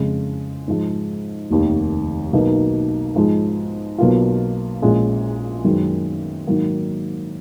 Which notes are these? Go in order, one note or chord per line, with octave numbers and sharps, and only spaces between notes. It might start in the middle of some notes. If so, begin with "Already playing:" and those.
Already playing: F2 C#3 G#3
G#2 F3 G#3
F1 D#2 D#3
B1 B2 A#3 D#4
G#2 F3 G#3
B1 B2 A#3 F4
A#1 A#2 G#3 C#4
F#2 D#3 G#3 B3
G#2 D#3 F#3 A#3